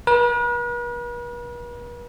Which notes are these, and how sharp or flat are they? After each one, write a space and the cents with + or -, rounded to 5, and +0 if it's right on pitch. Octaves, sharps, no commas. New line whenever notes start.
B4 -45